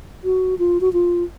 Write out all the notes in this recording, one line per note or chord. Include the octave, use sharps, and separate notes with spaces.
F#4
F4
F#4
F4